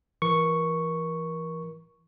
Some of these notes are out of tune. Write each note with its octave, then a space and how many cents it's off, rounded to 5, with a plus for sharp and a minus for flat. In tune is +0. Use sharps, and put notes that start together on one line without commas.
E3 +25 A#4 +25 C#6 +0